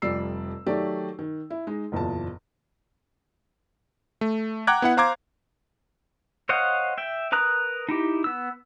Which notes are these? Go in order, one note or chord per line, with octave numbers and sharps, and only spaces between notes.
F1 F2 G3 D5 E6 C7
D#3 F#3 A3 G4 D5
D#3
E4
G#3 D#4
F#1 E2 A#2 A5
A3
F#5 G5 A#5 D6 F#6 G#6
B3 E4 F#5
C5 F5 A#5 C6 D6 G#6
C5 C#5 D#5 F5 F#5
E5 G5
A#4 B4 A#5 D#6 F#6
D#4 E4 G4
B3 E6